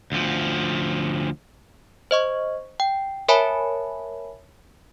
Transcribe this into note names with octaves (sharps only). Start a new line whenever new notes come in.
D2 F3
C5 D#5 C#6
G5
A#4 C#5 E5 G#5 A5 B5